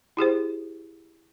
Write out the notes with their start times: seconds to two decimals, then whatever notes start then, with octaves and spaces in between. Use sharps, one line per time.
0.17 E4 G4 G#4 C5